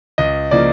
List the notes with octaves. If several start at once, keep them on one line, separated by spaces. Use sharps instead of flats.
C#2 D#5
C#3 F3 A#3 D5